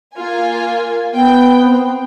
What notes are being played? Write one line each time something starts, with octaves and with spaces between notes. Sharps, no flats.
A#3 F4 G#5
B3 G5
C4